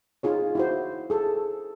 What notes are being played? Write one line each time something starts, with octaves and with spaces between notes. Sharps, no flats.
D#4 F4 G#4 C#5
E4 F#4 C5
G#4 A4